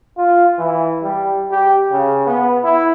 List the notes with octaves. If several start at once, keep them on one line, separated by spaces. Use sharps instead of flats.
F4
E3
G3
G4
C#3
B3
E4